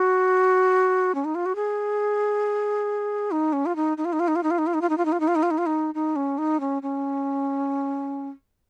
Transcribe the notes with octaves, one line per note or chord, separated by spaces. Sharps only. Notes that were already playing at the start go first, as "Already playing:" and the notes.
Already playing: F#4
C#4
D#4
F4
F#4
G#4
D#4
C#4
F4
D#4
D#4
F4
D#4
F4
D#4
F4
D#4
F4
D#4
F4
D#4
F4
D#4
F4
D#4
F4
D#4
F4
D#4
F4
D#4
F4
D#4
D#4
C#4
D#4
C#4
C#4